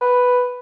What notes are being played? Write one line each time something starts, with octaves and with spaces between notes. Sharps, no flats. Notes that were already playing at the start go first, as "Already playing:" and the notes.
B4